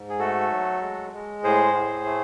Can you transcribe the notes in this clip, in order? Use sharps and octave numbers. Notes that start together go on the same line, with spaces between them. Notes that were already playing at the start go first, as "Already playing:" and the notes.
Already playing: G#2
G#4
A3 F#4 A4
F#3
G#3
G#3
A2 G#4 C5
A2
A3